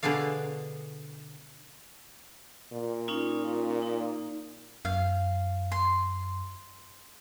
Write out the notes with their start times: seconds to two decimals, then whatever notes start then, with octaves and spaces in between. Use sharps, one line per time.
0.03 B2 D3 B3 G#4 D5 F5
2.72 A#2
3.08 C#4 D#4 F4
3.82 D#4
4.85 F#2 F5
5.72 C6